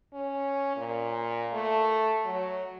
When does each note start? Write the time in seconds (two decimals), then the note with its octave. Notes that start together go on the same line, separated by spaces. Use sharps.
0.14 C#4
0.77 A#2
1.53 A3
2.25 F#3